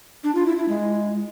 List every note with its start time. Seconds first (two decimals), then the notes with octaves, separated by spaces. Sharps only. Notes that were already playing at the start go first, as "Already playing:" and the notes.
0.24 D4
0.35 F4
0.46 E4
0.57 E4
0.69 G#3